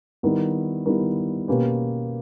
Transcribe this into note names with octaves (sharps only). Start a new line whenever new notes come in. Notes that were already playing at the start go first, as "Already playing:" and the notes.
D#3 G3 B3 E4 A#4
D#3 G3 B3 E4 A#4
B2 A#3 C#4 G4 B4